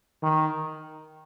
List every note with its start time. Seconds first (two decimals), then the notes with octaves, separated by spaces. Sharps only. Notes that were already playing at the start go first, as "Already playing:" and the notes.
0.23 D#3